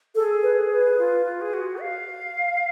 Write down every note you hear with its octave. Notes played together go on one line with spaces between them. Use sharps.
G#4 A4
B4
B4
F4
F4
G#4
F#4
F5